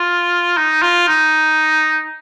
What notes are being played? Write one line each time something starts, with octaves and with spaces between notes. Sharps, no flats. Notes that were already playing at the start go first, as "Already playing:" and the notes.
Already playing: F4
D#4
F4
D#4